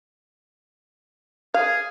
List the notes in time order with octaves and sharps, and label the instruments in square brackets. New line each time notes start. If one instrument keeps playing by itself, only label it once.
[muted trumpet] G#4 [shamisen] F5